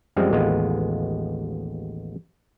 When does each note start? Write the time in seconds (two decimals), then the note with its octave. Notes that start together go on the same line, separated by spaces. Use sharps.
0.16 F#2 F3 G3 G#3 C4
0.31 A1 D#2 G#3 B3 F4